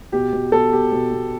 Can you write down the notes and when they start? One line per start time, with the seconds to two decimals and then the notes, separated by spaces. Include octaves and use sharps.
0.12 B2 G4
0.33 B2
0.52 B2 A4
0.73 B2 G4
0.92 B2
1.12 B2